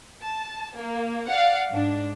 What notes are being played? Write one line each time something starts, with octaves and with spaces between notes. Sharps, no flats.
A5
A#3
D5 F5 F#5
G#2 D4